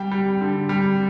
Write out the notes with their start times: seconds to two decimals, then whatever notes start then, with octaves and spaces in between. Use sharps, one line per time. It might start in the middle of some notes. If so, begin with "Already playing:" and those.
Already playing: G3 G5
0.11 G3
0.41 D3
0.69 G3